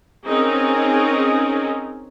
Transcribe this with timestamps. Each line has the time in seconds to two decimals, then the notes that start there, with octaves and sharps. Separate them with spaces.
0.24 C4 C#4 D#4 G#4 A#4